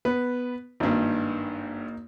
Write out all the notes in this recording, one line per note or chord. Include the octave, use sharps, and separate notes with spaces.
B3 B4
G#1 G2 A#3 D#4